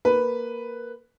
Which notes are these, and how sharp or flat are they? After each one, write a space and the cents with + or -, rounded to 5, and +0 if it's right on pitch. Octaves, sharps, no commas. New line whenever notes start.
A#3 +0 B4 +0